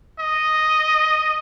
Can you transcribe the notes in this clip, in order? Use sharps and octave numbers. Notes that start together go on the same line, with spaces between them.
D#5